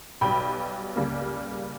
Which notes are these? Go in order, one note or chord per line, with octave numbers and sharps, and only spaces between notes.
B1 B2 G3 B3 G5 B5
C#2 C#3 G3 A#3